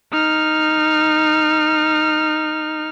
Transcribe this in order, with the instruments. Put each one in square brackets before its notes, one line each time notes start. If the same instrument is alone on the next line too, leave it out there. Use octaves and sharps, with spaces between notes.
[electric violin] D#4 F6